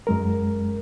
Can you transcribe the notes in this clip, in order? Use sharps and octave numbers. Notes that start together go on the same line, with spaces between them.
F#2 G#3 A#4